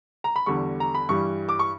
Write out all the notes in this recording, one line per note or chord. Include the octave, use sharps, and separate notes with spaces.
A#5
B5
E2 D3 G3 C#6
A#5
B5
G2 E3 G3 C#6
D6
C#6